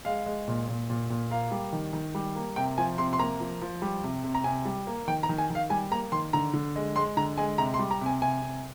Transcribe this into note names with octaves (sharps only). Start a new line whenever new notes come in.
G#3 F5
G#3
A#2
A#2
A#2
A#2
A#3 F5
G3
D#3
D#3
G3
A#3
C3 G5
F3 G#5
C3 C6
C6
A#3 A#5
F3
F3
G3
C3
C3
A#5
C3 G#5
G3
A#3
D#3 G5
A#5
D#3
G#5
D#3
F5
G3 G#5
A#3 A#5
D#3 C6
D3 A#5
D3
G#3
G#3 C6
D3 A#5
G#3 G#5
C3 A#5
C6
G3
A#5
C3 G#5
C3 G#5
C3